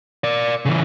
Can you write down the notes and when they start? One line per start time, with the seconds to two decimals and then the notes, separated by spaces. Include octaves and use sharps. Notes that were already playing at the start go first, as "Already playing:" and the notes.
0.24 A#4 D5
0.65 C#3 E3